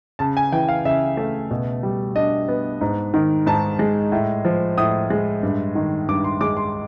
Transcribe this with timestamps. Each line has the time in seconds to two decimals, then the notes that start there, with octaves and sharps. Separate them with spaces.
0.19 C#3 A5
0.37 G#5
0.52 E3 G5
0.68 F5
0.85 C#3 E5
1.17 A3
1.51 B2
1.83 G3
2.16 D4 D#5
2.48 B3
2.81 G#2
3.14 D#3
3.46 G#2 A5
3.79 G#3
4.12 A2
4.45 F3
4.78 A2 D#6
5.10 G#3
5.43 G2
5.75 D#3
6.08 G2 D6
6.24 C6
6.41 G#3 D6
6.57 C6